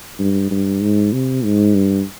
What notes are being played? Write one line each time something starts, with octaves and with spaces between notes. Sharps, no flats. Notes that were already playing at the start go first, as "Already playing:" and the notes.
G2
G2
G#2
C3
G#2
G2